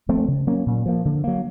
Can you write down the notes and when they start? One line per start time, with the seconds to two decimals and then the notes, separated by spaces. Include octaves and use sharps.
0.09 F3 A3 C4
0.28 C#3
0.47 F#3 A#3 C#4
0.66 A#2
0.86 F3 A#3
1.05 D3
1.24 F#3 A#3